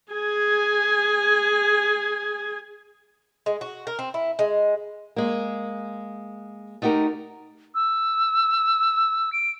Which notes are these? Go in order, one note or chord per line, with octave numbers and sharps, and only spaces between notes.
G#4 G#5
G#3
F#4
A#4
C4
E4
G#3
G#3 A#3
A3 D#4 F#4 G4 A#4
E6
D7